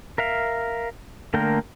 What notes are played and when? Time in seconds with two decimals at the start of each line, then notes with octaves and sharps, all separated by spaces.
0.18 A#4 E5 F5
1.34 D3 A3 A#3 A#4 G5